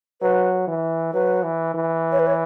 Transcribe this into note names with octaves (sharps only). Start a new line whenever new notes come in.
F#3 B4
E3
F#3 B4
E3
E3
C#5
B4
C#5